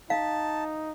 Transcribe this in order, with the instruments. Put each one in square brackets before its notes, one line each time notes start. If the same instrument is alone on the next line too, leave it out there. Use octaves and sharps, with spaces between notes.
[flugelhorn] D#4 [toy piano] F5 [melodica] A5